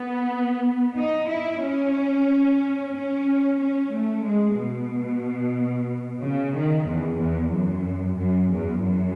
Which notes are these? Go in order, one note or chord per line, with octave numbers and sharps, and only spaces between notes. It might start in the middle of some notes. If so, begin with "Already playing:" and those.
Already playing: B3
D#4
E4
C#4
C#4
C#4
A3
G#3
B2
C#3
D#3
E2
E2
F#2
F#2
E2
F#2